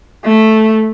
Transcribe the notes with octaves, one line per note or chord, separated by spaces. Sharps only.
A3